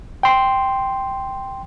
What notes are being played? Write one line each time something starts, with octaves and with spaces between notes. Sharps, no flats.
G5 C6